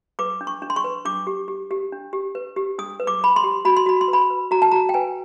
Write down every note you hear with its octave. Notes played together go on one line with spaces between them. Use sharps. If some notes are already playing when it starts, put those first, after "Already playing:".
B4 D6
D4
C#6
D4
C6
C#6
B4
D4 D6
G4
G4
G4
D4
G4
B4
G4
D4 D#6
B4
D6
B4 B5
C6
G4
F#4 B5
C6
F#4 B5
C6
B4
B5
B4
F#4 A#5
A5
F#4 A#5
G5
B4 G#5